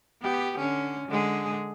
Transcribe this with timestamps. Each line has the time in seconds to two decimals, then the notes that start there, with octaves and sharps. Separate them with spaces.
0.22 B3 G4
0.58 D3 C#4
1.08 D3 G#3 G#4